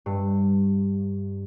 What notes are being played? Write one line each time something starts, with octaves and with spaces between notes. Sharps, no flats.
G2